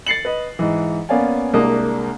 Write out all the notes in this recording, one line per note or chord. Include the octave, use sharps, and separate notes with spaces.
A6 C7 C#7 F#7
B4 D#5
G#2 E3
A#3 B3 C#4 D5 F5 G#5
C2 G#3 A#3 D4 D#6